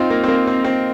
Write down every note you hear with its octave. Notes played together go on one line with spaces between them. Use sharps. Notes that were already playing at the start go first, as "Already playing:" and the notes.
Already playing: C4 D#4 F4
A#3
C4
A#3
C4
C4